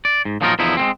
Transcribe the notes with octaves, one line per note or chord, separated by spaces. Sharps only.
D5
G#2
A#2 F3 F#3 D#4 F4 A#4
E2 D3 F3 D#4 E4
G#3 A#3 C4